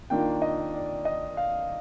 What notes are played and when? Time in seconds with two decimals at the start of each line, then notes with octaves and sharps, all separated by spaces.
0.10 D#3 A#3 D4 F4 G5
0.42 D#5
0.74 D5
1.05 D#5
1.37 F5